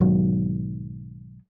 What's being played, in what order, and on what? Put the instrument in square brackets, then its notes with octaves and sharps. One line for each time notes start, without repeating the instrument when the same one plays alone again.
[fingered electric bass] B1 G#2 D#3 F#3